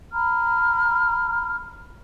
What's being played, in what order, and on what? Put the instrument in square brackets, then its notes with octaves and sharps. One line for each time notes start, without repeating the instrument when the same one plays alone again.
[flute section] A#5 B5 F6